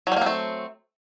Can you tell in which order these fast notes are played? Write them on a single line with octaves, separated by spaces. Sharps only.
F#3 G3 A#3 C4 A3